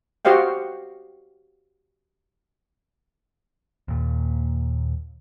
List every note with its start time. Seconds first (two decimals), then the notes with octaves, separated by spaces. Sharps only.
0.25 F#4 G4 C5 D#5 F5 G5
3.88 D#2 A#2